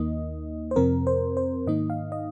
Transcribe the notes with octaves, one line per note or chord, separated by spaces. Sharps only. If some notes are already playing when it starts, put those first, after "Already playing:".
Already playing: D#2 D#3 A#3 D#4 D#5
C5
F2 C3 F3 C4 A#4
C5
C5
G#2 D#3 A#3 D#4 D#5
F5
D#5